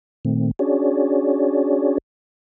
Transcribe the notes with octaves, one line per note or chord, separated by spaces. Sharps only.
A#2 D#3 A3 C4
C#4 D4 F#4 G#4 C#5 D5